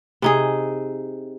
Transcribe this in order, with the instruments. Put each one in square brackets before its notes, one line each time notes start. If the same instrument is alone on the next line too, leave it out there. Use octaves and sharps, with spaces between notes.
[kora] C3 D#4 G#4